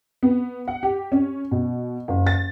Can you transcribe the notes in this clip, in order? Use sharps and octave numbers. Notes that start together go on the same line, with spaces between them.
B3
F#5
G4
C#4
B2
F#1
A6